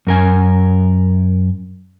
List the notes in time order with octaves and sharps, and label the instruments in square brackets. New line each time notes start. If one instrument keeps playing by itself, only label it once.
[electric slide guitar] F#2 A#4 G#5